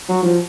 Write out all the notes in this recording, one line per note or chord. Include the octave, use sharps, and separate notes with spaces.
F#3
F3